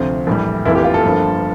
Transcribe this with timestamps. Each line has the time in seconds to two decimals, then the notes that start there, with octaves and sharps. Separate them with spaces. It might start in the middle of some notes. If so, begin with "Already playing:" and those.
Already playing: D2 C3 F3 C4
0.27 A#1 A2 E3 G3
0.65 F1 F2 E3 A#3 E4
0.75 G4
0.84 F4
0.94 A4
1.03 G1 G2 F3 A#3